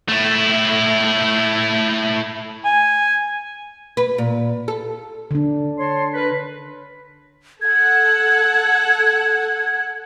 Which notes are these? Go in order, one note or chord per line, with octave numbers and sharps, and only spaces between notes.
A3 E4
G#5
B4
A#2
A4
D3 D4
C#5 A5 C6
A#4 B4
A4 F#5 G#6